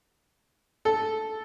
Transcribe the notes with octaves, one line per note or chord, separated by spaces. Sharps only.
A4